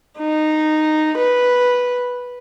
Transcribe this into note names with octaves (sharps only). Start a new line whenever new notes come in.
D#4
B4